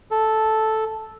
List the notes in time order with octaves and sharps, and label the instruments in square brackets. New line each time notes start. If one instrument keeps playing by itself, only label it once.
[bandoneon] A4